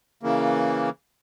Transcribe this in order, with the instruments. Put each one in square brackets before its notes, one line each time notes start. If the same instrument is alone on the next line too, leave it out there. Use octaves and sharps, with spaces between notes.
[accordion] C#3 E3 A#3